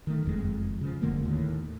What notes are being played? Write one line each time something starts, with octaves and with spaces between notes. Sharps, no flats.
D#3 A3
F#1 F2 C3 G#3
C#3 F3
F1 D3 A3 A#3
D#2 A2